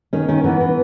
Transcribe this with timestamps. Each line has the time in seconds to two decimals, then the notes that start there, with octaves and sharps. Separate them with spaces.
0.13 D#3 C#4
0.29 D#3 C#4
0.44 E3 B3
0.60 E3